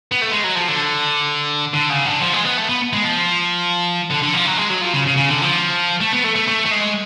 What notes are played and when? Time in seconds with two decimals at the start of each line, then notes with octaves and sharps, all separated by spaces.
0.11 B3
0.22 A3
0.32 G#3
0.44 F#3
0.55 F3
0.68 D3
1.74 D3
1.90 C#3
2.06 D3
2.21 F3
2.33 G#3
2.45 B3
2.58 A3
2.69 B3
2.93 G#3
3.04 F3
4.11 D3
4.23 D3
4.34 F3
4.46 F#3
4.58 G#3
4.70 F#3
4.81 F3
4.94 C#3
5.06 C#3
5.17 C#3
5.30 D3
5.41 F3
6.01 A3
6.13 B3
6.24 A3
6.36 A3
6.48 A3
6.65 A3
6.71 G#3